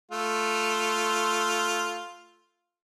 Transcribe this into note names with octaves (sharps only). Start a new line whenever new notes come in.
A3 F4